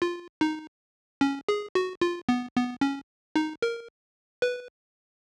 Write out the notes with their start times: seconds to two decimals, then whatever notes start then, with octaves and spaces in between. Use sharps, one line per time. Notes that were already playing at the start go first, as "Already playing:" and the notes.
0.02 F4
0.41 D#4
1.21 C#4
1.49 G#4
1.75 F#4
2.02 F4
2.29 B3
2.56 B3
2.81 C#4
3.36 D#4
3.62 A#4
4.42 B4